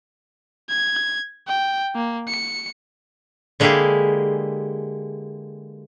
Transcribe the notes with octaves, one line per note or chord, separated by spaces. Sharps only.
G#6
G5
A#3
C#7
D3 G#3 A#3 E4 G4 G#4